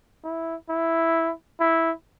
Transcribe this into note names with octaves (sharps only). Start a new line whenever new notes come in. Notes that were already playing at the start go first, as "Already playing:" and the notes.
E4
E4
E4